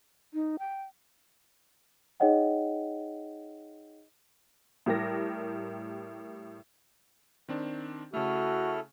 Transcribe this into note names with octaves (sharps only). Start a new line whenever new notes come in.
D#4
G5
D#4 G#4 C#5 D#5 F#5 G5
A2 G3 G4 A#4 A#6
D#3 C4 D4
C#3 A3 E4 F#4 A4 F6